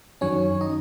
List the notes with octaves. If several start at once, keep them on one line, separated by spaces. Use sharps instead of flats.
F#2 D#3 F#3 C#4 C#5
D#4 D#5